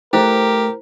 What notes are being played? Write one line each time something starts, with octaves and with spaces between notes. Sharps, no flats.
A3 E4 G4 A#4 C5